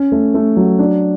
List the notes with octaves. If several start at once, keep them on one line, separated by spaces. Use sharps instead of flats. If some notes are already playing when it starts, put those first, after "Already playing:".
Already playing: C#4
A3
A3
F#3
D4